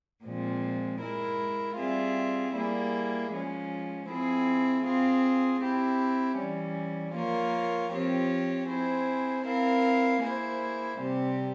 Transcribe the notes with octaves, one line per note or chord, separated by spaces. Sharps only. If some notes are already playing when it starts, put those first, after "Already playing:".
A#2 F3 G#3 C4
G#3 E4 A#4
G3 C4 F4 G#4 E5
G3 A#3 E4 G#4
F3 G#3 C#4
F3 C4 E4 G#4
C4 F4 G#4
C4 E4 G4
E3 G3 C#4
F3 A#3 F4 A#4 C#5
F3 C4 G4 C#5
C4 E4 G#4 C5
C4 E4 A#4 F5
A#3 E4 G#4 C5
C3 G3 C4 G4